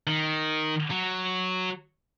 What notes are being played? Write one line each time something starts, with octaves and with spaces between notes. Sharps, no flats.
D#3
F#3